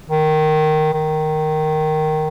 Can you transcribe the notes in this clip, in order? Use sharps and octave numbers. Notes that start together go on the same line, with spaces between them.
D#3
D#3